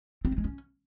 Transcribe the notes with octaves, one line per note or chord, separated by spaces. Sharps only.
C4
A3
G#3
C#4